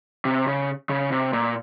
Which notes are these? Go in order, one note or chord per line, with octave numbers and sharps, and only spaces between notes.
C3
C#3
C#3
C3
A#2